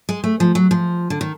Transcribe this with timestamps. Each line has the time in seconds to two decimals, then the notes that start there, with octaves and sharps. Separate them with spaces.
0.09 G#3
0.24 A3
0.40 F3
0.55 F#3
0.71 F3
1.10 D3
1.21 D#3